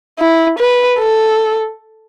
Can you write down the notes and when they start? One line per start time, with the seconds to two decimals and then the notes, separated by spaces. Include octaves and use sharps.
0.19 E4
0.59 B4
0.99 A4